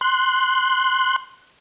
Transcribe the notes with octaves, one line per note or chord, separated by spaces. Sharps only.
C6 F#6